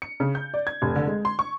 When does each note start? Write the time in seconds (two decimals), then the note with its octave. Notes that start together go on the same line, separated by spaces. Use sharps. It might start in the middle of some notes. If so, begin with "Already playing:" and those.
0.02 C#7
0.20 C#3
0.35 G6
0.54 D5
0.67 G#6
0.82 F1
0.96 D3
1.07 G#3
1.25 C6
1.39 C#6